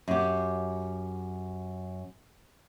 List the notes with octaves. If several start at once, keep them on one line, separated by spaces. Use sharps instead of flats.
F#2 G4